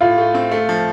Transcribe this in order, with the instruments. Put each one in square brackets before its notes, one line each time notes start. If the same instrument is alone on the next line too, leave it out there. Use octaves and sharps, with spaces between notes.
[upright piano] A2 [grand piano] F4
[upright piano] A3
C4
A3
F3